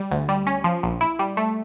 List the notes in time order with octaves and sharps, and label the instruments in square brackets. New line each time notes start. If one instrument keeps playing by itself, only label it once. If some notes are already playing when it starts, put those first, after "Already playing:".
Already playing: [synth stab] G3
D2
G3
C#4
F3
A#1
E4
G3
A3